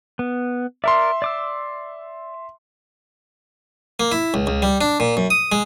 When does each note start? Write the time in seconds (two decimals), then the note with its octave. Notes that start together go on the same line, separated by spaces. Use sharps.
0.19 B3
0.84 A#4 D5 E5 C6
1.22 D5 D6 E6
4.00 A#3
4.12 E4
4.34 C#2
4.47 C#2
4.62 G3
4.81 D4
5.00 A#2
5.17 F#2
5.30 D#6
5.52 G#3